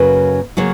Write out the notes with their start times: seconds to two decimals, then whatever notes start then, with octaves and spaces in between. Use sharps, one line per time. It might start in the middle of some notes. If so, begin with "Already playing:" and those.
Already playing: F#2 C#3 F#3 A#3 B4
0.57 C#3 F#3 A#3 C#5